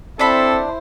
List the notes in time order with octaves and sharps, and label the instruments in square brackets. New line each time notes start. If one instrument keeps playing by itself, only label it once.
[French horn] C4 [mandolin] D4 B5 [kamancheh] E4 C5 [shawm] A4